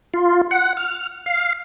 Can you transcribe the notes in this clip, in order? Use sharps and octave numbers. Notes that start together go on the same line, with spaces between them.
F4
F#5
F6
F5